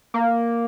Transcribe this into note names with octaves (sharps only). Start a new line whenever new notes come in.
A#3